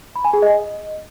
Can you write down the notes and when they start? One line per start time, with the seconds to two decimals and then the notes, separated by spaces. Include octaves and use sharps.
0.16 B5
0.24 G#5
0.33 G#4
0.42 D#5